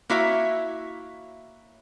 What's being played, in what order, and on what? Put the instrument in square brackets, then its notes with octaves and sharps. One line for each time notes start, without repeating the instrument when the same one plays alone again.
[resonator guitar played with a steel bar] A#3 E4 F#4 C#5 E5